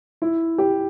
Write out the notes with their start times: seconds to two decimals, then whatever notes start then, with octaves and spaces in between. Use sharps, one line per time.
0.22 E4
0.58 G4